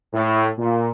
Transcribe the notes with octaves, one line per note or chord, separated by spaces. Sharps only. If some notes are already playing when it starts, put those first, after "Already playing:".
A2
A#2